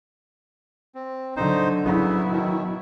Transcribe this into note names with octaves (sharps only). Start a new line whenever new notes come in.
C4
D3 F#3 D#4 C5
C#3 F#3 B3 E4
B2 D#3